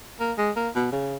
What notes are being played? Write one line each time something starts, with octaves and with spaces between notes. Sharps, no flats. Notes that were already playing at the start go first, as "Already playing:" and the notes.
A#3
G#3
A#3
B2
C#3